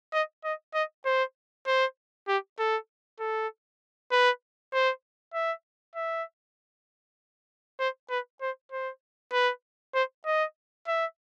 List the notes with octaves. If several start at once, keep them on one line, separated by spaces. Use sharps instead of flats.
D#5
D#5
D#5
C5
C5
G4
A4
A4
B4
C5
E5
E5
C5
B4
C5
C5
B4
C5
D#5
E5